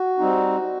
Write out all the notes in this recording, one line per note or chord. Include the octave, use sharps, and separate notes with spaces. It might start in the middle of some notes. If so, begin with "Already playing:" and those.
Already playing: F#4
G3 C4 D#4